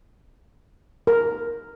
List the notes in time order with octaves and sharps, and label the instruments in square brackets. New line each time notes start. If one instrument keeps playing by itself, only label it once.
[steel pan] A#4